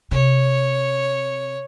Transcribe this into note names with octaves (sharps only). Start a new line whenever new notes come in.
C3 C#5